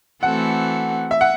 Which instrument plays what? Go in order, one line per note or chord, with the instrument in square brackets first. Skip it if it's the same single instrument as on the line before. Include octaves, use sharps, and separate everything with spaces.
[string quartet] E3 A3 C4 F#4 A4 [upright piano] F#5
[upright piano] E5
F#5